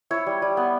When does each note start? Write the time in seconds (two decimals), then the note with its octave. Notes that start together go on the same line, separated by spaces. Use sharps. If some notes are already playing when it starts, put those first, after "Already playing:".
0.11 E4 C#5
0.26 G3
0.42 G3
0.57 B3